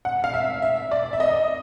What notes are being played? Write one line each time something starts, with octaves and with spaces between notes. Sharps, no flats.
F#5
F5
E5
E5
D5
E5
D#5